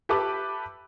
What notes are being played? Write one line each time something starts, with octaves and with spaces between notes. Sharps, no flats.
G4 A4 B4 E5 A5 D6